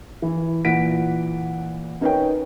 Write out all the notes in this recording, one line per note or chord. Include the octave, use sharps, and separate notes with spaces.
E3
A#2 E3 F#5 B6 D7
C#4 D#4 A#4 B4 C#5 G5